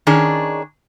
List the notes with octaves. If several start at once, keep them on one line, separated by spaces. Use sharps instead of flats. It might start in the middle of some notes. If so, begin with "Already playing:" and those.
D#3 C#4 D4 G#4